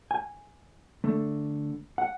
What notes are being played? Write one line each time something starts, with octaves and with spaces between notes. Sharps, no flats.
G#5
D3 A3
F#5